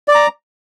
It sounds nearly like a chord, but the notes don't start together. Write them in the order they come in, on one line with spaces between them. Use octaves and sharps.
D5 D6 A#5